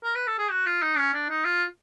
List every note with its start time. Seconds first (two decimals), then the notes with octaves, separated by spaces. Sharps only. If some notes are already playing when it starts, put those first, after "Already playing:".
0.04 A#4
0.15 B4
0.27 A4
0.39 G#4
0.51 F#4
0.66 F4
0.82 D#4
0.98 C#4
1.14 D4
1.29 D#4
1.45 F4